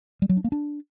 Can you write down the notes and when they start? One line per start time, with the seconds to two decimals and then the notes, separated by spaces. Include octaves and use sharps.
0.22 G3
0.29 F#3
0.37 D4
0.44 A#3
0.52 D4